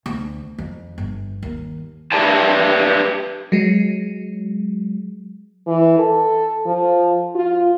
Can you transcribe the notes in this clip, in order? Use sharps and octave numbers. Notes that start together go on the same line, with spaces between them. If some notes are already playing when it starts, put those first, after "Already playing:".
D2
F2
G1
D#2
G4 B4 D5 E5 G5 A5
F#3 G#3
E3
A4
F3
F4